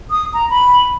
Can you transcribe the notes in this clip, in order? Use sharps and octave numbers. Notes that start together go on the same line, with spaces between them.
D#6
A#5
B5